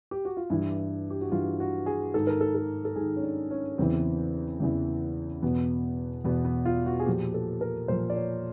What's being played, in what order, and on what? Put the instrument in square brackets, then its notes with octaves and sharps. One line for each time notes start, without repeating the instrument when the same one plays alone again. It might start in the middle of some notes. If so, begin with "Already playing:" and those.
[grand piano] G4
F#4
F4
G2 E3 E4
G4
F#4
G2 E3 F4
F#4
G#4
G#2 D#3 A4
A#4
A4
A4
A4
G#2 D#3 G#4
C#4
D4
C#4
E2 C#3 E3 C4
E2 C#3 E3
E2 B2 B3
E2 B2 B3
B3
F4
F#4
G#4
A#2 F3 G4
A4
A#4
A#2 F3 C5
D5
C#5